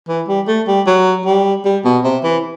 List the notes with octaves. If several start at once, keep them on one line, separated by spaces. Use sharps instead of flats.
E3
G3
A3
G3
F#3
G3
G3
B2
C3
E3